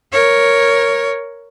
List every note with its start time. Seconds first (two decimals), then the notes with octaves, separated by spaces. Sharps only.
0.12 A#4 C#5